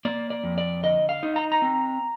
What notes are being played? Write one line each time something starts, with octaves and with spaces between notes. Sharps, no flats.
A#3 D5
D5
F2
D5
D3 D#5
F5
D#4
A#5
A#5
C4